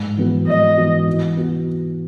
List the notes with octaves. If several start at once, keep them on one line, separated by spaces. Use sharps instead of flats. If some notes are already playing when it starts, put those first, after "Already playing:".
Already playing: G#2
E3 B3 F#4
G#2 D#5
E3 B3 F#4
E3
B3 F#4